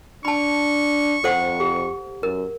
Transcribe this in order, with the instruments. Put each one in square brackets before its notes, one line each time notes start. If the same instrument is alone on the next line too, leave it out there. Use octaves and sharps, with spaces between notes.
[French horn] D4 [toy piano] A5 B5 [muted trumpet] C#6
[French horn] F2 [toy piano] A4 C5 F#5
[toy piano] G4
[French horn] F#2 [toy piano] A#4